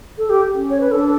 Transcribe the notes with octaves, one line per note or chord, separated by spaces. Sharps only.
A4
G4
C#4
C#5
B4
D4 A4